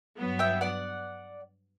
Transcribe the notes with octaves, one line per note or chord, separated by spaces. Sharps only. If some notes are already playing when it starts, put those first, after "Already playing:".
G2 F#3 B3
E5 G5
D5 F#5